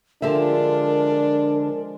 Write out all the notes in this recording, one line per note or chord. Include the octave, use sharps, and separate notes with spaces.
D3 F3 G#3 D4 G4 A#4 E5